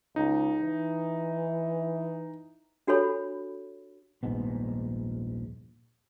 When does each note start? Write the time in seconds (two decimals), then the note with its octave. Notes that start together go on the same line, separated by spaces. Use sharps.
0.16 C#2 D#4
0.62 E3
2.87 D4 F#4 G4 A4 C#5 B5
4.23 D#1 A#1 G#2 B3